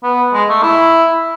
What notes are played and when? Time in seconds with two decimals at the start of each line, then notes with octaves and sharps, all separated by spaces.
0.03 B3
0.33 G#3
0.49 A3
0.63 E4